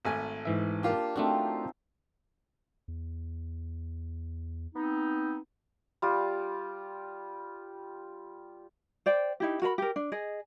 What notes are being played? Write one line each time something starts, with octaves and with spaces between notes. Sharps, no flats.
G#1 A3 G#5
G#2 E3 E5
A#3 D4 F4 G4
F3 A3 C4 D4 D#4 F#4
E2
B3 C4 D#4
G3 F4 G4
C5 D5 G5
D#4 E4 G4
F#4 A#4 G#5 B5
G4 A#4
D4
G#4 D#5